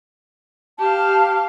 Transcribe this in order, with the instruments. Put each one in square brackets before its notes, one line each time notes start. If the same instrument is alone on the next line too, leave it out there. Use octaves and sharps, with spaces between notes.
[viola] G4 F5 [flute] A5